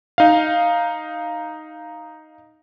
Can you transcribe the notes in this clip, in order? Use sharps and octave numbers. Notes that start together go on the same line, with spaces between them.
D#4 F5